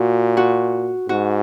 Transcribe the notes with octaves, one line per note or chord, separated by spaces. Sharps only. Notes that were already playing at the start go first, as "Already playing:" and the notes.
Already playing: A#2 F#4
F#4
G#2 F#4